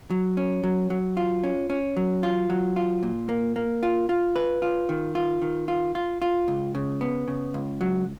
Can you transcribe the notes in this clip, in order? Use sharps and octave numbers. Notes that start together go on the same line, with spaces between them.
F#3
C#4
F#3
F#3
F4
C#4
C#4
F#3
F4
F#3
F4
A#2
A#3
A#3
F4
F4
B4
F4
D#3
F4
D#3
F4
F4
F4
C#2
C#3
B3
C#3
C#2
F#3